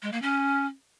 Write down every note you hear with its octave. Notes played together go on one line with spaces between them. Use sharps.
G#3
A#3
C#4